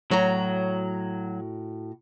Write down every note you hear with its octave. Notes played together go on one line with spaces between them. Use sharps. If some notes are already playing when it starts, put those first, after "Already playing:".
A2 F#3 F#4 C#5 A#5